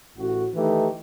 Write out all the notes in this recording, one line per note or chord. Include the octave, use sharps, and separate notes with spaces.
A1 A2 F#4
D#3 E3 A3 D#4 G4